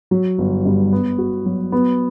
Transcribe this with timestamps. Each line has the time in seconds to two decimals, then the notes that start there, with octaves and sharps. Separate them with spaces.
0.11 F#3
0.38 G1
0.65 G2
0.93 B3
1.18 F#4
1.46 F#3
1.72 B3